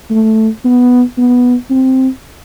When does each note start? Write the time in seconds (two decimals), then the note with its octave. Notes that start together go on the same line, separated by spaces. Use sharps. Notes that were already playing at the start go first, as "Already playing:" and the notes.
0.11 A3
0.65 B3
1.18 B3
1.70 C4